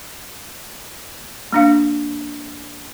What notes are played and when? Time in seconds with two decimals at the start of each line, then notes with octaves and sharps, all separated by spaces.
1.52 A#3 D4 F5